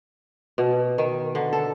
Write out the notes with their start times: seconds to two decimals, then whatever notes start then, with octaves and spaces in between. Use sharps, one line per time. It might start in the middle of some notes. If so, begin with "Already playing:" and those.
0.58 B2
0.98 D#3
1.35 D3
1.53 A4